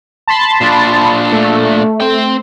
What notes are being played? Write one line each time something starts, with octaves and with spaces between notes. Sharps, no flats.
A5 B5 C6
A#2 D4
A3
C4 G5